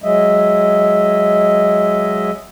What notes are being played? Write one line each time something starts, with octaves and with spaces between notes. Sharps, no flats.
F#3 G#3 D#5 E5